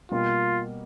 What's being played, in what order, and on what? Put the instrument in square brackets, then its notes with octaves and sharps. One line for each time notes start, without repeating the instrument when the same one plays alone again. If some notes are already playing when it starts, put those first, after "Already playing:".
[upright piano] B2 G3 A#3 [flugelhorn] F4